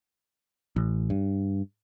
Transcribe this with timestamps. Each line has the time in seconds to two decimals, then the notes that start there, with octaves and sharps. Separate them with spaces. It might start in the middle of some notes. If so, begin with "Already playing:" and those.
0.76 A1
1.10 G2